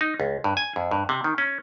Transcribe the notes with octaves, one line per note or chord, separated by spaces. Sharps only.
D#4
C#2
G2
G#5
F2
G2
C3
D#3
C#4